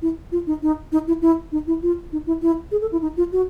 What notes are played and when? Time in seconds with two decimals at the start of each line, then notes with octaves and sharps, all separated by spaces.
0.02 E4
0.32 F4
0.47 D#4
0.62 D#4
0.92 D#4
1.07 E4
1.22 E4
1.52 D#4
1.67 E4
1.83 F4
2.12 D#4
2.27 E4
2.42 E4
2.71 G#4
2.81 A4
2.92 E4
3.02 D#4
3.17 F4
3.32 F#4